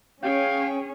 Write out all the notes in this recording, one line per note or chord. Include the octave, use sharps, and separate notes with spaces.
C#4 G#4 C#5 F5 G5